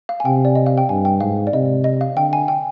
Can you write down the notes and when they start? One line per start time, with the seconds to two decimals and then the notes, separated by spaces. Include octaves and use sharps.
0.09 F5
0.20 G#5
0.25 C3 G5
0.45 D5
0.55 D#5
0.66 F5
0.78 G5
0.89 G2 G#5
1.05 G5
1.20 G#2 F5
1.47 D5
1.53 C3 D#5
1.84 D#5
2.01 F5
2.17 D3 G5
2.33 G#5
2.48 G5